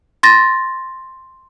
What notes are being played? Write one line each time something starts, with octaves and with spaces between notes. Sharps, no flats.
C6 A6 A#6